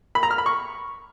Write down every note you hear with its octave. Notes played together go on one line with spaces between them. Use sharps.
B5
A#5
F6
B5
C#6